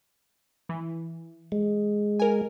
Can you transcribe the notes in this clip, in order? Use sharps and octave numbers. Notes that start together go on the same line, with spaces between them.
E3
G#3
A#4 G#5